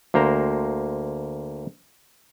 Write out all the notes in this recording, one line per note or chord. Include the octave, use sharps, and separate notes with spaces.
D2 A#3 C5 A#5